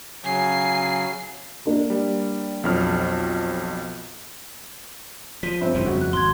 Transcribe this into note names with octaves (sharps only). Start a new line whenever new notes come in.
C#3 F#3 G#5 C7
A#3 D4
G3
B1 F2 F6
F3 B6 D#7
G1 C4
G2 C#3 E3
F2 C#3 F#4
F#6
G#1 C6 G#6